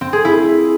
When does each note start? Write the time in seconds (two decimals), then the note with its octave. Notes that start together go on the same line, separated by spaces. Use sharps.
0.01 C4
0.13 G#4
0.25 E4